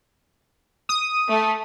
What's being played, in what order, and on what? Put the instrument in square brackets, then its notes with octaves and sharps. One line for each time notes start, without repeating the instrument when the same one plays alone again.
[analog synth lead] D#6
[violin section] A3